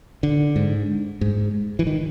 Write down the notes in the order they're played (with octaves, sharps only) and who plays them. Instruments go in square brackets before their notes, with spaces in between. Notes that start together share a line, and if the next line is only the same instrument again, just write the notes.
[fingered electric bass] D3
G#2
G#2
E3
D#3